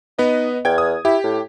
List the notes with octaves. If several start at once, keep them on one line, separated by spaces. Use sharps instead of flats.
B3 D#4 B4 D#5
E2 G5 G#6
D#6
E4 G4
A2